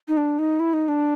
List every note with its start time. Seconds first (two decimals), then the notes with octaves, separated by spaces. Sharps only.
0.08 D#4
0.17 D4
0.39 D#4
0.60 E4
0.73 D#4
0.88 D4